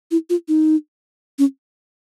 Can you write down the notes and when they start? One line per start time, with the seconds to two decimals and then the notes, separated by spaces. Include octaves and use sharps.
0.11 E4
0.30 F4
0.48 D#4
1.39 C#4